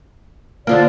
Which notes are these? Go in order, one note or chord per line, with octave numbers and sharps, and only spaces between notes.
D3 F3 A#3 D5